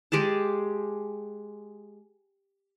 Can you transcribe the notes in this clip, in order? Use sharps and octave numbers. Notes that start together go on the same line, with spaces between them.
G#3 G4 G#4 A5